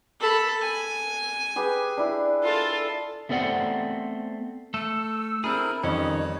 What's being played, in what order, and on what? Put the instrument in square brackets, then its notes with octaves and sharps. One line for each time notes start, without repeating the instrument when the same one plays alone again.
[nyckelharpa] A4 B5
G#5
[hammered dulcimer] G4 G#4 B4
D4 E4 G#4
[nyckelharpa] F4 A4
[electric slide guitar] A3 B3 C4 A4 D5 F#5
[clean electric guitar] A3 A4 [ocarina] E6
[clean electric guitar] C4 D4 G#4 [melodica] E4 A#4
[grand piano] F2 [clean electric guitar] D#3 C#4 [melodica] G3 C#5 [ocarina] D#5